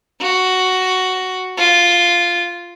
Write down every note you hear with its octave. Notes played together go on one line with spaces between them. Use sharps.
F#4
F4